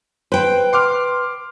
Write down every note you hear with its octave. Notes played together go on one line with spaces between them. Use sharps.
B4 C5 G5
C6 D6 F6